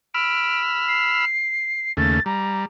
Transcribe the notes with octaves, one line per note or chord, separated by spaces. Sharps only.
B5 E6 F6 D7
C7
D#2 C#3 A3 A6
G3 A#5